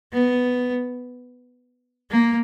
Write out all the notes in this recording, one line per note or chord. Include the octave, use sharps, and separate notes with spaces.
B3
A#3